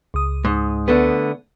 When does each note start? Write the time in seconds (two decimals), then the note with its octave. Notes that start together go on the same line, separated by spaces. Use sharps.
0.14 C#2 D#6
0.45 G#2
0.88 D3 A3 B3